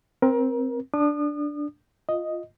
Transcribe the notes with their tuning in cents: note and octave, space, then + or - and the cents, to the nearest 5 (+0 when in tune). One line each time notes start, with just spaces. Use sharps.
C4 +0 A#4 +30
D4 +0 D#6 -40
F4 +0 D#5 +0